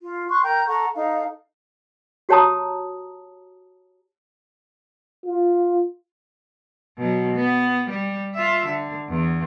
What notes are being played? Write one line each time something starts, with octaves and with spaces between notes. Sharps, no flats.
F4
C6 C#6 F#6
A#4 G5 A#5 G6
A4 F#5 A#5 C#6
D#4 A4 F5
F#4 G4 C#5 A5 A#5 D#6
F4
B2 F#3
B3
G3
F4 E5
D3
E2